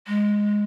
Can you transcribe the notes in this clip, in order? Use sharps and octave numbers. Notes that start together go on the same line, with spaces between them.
G#3